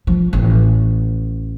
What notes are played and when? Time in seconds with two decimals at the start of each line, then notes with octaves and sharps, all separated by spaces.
0.07 F3
0.33 A1